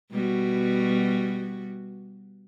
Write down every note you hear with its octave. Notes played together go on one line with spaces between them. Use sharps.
B2 G3 F#4